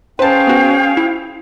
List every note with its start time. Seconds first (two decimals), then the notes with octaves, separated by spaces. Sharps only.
0.19 C#4 G#4 B4 C5 F5 G5 A5
0.47 B3 F#4
0.97 E4